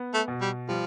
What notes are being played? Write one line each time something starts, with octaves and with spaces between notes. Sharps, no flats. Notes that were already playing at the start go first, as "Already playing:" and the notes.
Already playing: B3
A3
B2
G3
F3 G3